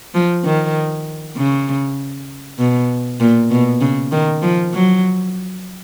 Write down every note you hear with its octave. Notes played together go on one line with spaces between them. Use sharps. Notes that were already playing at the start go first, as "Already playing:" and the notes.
F3
D#3
C#3
B2
A#2
B2
C#3
D#3
F3
F#3